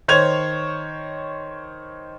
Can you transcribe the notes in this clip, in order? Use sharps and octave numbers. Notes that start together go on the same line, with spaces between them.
D#3 C5 C#5 G#6 F7